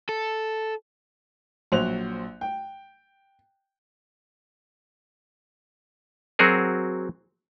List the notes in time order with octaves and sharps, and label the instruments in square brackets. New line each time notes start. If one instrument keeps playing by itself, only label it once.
[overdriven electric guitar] A4
[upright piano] A#1 F#3 C5 F#6 F7
G5
[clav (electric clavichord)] F#3 C4 F#4 G#4 A#4